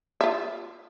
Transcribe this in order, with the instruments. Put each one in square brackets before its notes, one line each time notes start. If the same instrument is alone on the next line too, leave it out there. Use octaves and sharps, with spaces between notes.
[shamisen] F4 E5